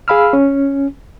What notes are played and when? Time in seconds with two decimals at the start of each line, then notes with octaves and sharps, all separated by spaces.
0.08 G#4 F5 B5 E6 F6
0.33 C#4